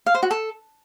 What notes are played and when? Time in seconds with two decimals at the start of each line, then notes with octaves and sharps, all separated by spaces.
0.06 F5
0.14 C5
0.23 F#4
0.31 A4